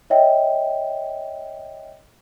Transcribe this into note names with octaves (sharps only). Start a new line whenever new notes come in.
C#5 D#5 E5 G5